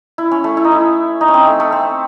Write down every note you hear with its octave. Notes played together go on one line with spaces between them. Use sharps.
E4
C#4
A3
E4
D#4
E4
D#4
C#4
C4
A3
A3
C4